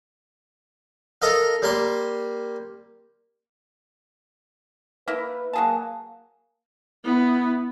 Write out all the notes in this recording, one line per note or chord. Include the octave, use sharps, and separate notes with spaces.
A4 A#4 D#5 F5
G3 A#3 C6
A#3 E4 B4
F#3 A#3 G#4 A5
B3 E4